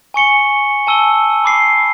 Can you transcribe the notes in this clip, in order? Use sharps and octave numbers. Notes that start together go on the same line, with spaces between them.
G#5 C#6 C#7 G7
G#5 A5 E6 D#7 G7
B5 D6 C7